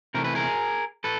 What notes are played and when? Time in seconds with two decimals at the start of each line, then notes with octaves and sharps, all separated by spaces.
0.14 C3 E3 A3 A#4
0.24 B4
0.35 G#4 A#4
1.04 A4 B4